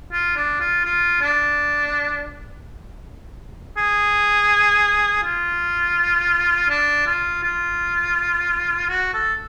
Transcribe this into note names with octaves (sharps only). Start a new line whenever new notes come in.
F4
D4
F4
F4
D4
G#4
F4
D4
F4
F4
F#4
A4